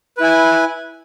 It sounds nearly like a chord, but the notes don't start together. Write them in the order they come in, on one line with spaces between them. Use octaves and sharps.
B4 E4 G#5